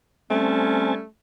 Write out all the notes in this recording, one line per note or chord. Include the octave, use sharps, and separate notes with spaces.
G3 A3 C4 C#4 G#5 A5